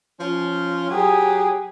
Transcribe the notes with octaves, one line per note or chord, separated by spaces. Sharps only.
F3 C#4 F4
F#3 G4 G#4